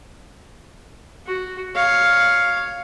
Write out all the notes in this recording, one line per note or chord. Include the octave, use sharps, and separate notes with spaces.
F#4
C#5 F5